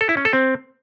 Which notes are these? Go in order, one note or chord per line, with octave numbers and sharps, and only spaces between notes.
A4
E4
C#4
A4
C4